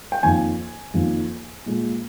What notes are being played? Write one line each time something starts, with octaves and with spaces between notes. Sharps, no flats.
G5
F2 D#3 A#3 G#5
F2 D#3 A#3
A#2 G#3